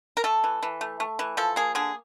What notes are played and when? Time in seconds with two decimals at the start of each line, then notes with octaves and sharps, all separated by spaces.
0.17 A#4
0.24 A3 A4
0.44 E3
0.63 E3
0.81 A3
1.00 A3
1.19 E3
1.37 F3 A4
1.56 A#3 G#4
1.75 D3 G#4